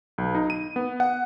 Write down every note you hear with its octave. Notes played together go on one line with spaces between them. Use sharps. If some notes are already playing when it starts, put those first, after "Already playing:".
B1
D#4
D#7
B3
F#5